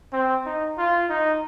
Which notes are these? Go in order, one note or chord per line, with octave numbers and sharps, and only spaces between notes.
C4
D#4
F4
D#4